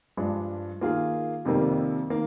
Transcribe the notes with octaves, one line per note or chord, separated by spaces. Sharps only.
G2 F3 G#3 D4
D#3 A#3 F4 G#4
F2 C3 D#3 G3 A#3
D#3 A#3